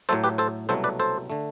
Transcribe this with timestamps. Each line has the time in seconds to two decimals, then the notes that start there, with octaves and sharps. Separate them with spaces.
0.09 A2 F#3 A3 A4 C5
0.24 G4 B4
0.38 A4 C5
0.69 C2 B2 F#3 A3 A4 C5
0.84 B4 D5
0.99 A4 C5
1.30 D3 A3